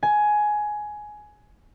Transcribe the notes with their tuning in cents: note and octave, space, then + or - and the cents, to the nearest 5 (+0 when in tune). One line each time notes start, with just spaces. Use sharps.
G#5 +15